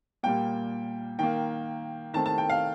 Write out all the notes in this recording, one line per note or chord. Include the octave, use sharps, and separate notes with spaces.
A#2 G3 A#3 G5
D#3 A#3 G5
D#3 A3 C4 A5
A5
G5
F5